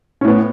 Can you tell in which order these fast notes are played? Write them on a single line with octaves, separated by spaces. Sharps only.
C#4 A2 B3